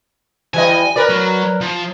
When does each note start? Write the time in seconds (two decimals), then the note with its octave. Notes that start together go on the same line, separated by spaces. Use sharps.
0.54 E3 G3 D#5 G#5
0.96 A#4 B4 D5
1.09 F#3
1.61 F3